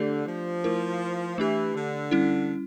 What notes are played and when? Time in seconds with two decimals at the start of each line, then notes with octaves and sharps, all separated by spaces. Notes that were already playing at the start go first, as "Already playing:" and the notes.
Already playing: D3 A3 D4 G4 D5
0.26 F3
0.64 A3 E4 A#4
1.38 E3 A3 D4 G4
1.75 D3
2.11 G3 C#4 E4